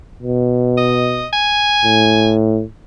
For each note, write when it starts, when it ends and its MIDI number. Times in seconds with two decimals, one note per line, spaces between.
0.22 1.28 47
0.78 1.27 75
1.33 2.30 80
1.85 2.63 45